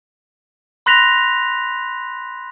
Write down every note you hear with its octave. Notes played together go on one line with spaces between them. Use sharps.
B5 C6 F#6 A#6 B6 F7